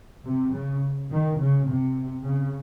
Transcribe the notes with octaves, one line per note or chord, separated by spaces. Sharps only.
C3
C#3
D#3
C#3
C3
C#3